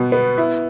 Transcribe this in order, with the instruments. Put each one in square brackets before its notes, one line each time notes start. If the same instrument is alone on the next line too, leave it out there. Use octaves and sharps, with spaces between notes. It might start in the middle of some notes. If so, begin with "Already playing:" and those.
Already playing: [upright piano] B2 B3
B3
E4